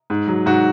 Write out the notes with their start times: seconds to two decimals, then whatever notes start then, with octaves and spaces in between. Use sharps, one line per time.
0.10 G#2
0.27 F#3
0.46 G#2 F#4